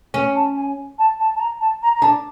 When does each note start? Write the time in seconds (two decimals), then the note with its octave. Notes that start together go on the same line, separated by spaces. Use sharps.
0.14 C#4
0.35 A5
0.55 G#5
0.98 A5
1.18 A5
1.35 A5
1.39 A#5
1.60 A5
1.82 A#5
1.94 A#5
2.02 D4 A5